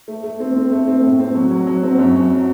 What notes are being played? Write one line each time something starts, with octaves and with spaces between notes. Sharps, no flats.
A3
A3
C4
C4
A3
C4
A2
C4
F#3
F#3
F#3
C4
F#2
F#3